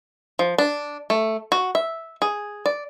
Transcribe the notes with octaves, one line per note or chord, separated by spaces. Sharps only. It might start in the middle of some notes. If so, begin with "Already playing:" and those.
F3
D4
A3
F#4
E5
G#4
D5